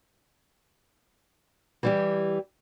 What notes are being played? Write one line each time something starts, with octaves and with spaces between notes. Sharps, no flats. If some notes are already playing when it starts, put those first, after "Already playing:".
E3 G3 G4